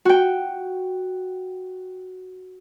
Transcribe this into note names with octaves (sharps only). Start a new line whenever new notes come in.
F#4 G5